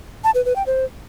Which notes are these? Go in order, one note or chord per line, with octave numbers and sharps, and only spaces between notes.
A5
B4
B4
G5
C5